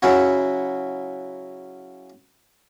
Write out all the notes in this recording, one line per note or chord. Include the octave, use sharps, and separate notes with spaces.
C#3 F#3 C#4 E4 F#4